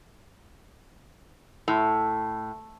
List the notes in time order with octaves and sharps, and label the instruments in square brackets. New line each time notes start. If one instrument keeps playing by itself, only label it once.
[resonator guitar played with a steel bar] A2